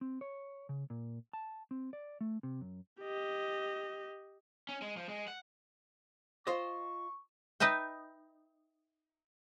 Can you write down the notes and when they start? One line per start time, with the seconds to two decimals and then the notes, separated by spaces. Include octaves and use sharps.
0.01 C4
0.21 C#5
0.69 C#3
0.90 A#2
1.33 A5
1.71 C4
1.93 D5
2.21 A3
2.43 C3
2.61 F#2
3.01 G4 D#5
4.69 C#4
4.82 G#3
4.97 F3
5.09 G#3
5.28 F#5
6.47 F4 C5 D#5 C#6
7.60 D#4 B4 D#5 E5 G5